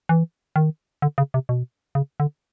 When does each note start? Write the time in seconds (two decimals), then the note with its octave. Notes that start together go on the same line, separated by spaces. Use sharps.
0.09 E3
0.56 D#3
1.02 D3
1.18 C#3
1.34 C3
1.49 B2
1.95 C#3
2.20 D3